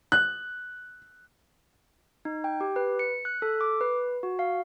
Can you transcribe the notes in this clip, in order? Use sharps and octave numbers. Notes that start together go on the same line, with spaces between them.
F#6
D#4
G5
G4
B4
C#7
F#6
A4
D6
B4
F#4
F5